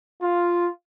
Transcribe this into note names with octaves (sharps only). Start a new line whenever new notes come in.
F4